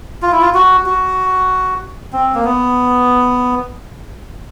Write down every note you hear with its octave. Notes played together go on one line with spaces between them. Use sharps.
F4
E4
F4
F#4
F#4
C4
A#3
B3